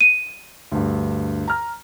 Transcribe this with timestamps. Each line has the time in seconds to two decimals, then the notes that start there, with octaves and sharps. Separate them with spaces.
0.01 D#7
0.72 D2 G2
1.48 A#5 F6